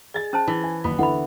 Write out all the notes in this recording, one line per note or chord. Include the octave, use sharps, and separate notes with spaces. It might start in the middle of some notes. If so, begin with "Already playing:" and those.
G#4 D5 D#5 A6
C#4 C5 A5
E3
G#5
F#1 D#2 B3 B5
D3 E3 E4 F#5 B5